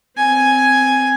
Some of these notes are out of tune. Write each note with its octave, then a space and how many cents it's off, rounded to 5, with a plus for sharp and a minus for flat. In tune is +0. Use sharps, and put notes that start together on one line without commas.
C4 -10 G#5 +5